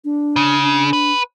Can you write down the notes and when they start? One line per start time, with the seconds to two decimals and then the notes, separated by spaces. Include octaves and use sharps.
0.05 D4
0.36 C#3
0.62 D4
0.93 B4